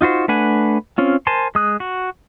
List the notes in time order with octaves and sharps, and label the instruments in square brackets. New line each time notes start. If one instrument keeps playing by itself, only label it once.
[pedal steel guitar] D#4 F4 F#4 C5
A3 D4 B4 F#5 G#5
C4 C#4 F4
A#4 C5 G#5 A5 C6
G#3 D#6 F#6
F#4